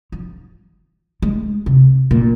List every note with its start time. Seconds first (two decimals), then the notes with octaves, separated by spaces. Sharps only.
0.12 F3
1.22 G#3
1.66 C3
2.11 A#2